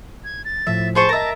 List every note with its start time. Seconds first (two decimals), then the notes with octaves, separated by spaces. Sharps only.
0.24 G#6
0.45 A6
0.67 A2 F3 E5
0.95 G#4 C5 A5 C#6
1.09 A#4 D#5 E5 A6 A#6